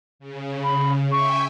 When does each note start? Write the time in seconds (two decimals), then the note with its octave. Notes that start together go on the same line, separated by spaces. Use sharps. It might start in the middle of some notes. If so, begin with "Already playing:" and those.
0.19 C#3
0.64 B5
1.12 E5 G5 G#5 C#6